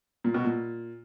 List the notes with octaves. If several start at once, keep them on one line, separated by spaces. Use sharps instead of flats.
A#2
B2
A#2